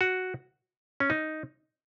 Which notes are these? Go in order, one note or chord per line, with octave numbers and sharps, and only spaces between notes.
F#4
C#4
D#4